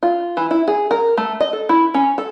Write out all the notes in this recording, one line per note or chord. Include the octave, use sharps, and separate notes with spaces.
F4
E3
E4
G#4
A#4
A3
D#5
A4
E4
C#4
A4